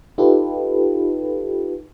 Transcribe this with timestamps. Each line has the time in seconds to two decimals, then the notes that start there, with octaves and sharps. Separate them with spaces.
0.18 D#4 F4 G4 A4 B4